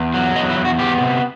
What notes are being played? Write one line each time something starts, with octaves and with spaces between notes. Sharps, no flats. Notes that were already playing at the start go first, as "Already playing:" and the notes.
Already playing: E2
F#3
E2 D#5
E4
E2
F#4
B3 G4
C3